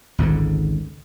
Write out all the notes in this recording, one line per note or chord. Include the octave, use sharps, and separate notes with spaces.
G#1 C#2 G#2 D3